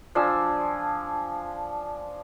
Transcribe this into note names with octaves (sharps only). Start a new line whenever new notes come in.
F3 D4 G#5 E6